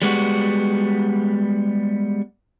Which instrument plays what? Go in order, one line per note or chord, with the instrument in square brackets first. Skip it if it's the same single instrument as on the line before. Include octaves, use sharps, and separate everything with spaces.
[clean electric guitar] G3 G#3 B3 F#4